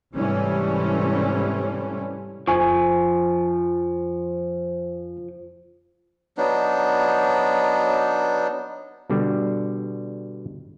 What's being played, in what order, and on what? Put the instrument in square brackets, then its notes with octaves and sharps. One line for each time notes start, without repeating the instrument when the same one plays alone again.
[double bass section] G#2 C3 E3 G3 A3 C#4
[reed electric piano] F2 G#5 C#6 [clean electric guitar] F3
[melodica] F#3 B3 D4 D#4
[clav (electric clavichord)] B2 D3 G3